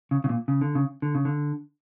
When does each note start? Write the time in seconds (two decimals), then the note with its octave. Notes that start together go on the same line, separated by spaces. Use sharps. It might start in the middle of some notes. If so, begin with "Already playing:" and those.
0.11 C#3
0.24 C#3
0.29 A#2
0.48 C#3
0.61 D3
0.75 C#3
1.02 D3
1.15 C#3
1.25 D3